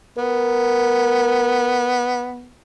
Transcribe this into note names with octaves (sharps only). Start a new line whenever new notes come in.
B3 A#4